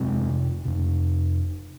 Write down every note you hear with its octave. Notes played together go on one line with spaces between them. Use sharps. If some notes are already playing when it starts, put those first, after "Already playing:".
Already playing: F2 C3 G#3 C4
F2 C3